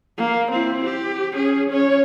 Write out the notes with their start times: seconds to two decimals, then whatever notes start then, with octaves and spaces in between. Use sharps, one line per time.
0.18 A#3
0.51 C4 E4
0.85 G4
1.33 C#4 G#4
1.70 C#4 C#5